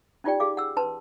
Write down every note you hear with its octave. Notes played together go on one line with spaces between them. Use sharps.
C#4 D#4 F4 G4 D5 G5
G4 G#4 F5 D6
F#5 E6
C#4 B4 A5 C6